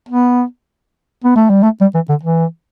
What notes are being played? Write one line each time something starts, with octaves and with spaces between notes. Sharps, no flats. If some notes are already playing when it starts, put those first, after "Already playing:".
B3
B3
A3
G3
A3
G3
E3
D3
E3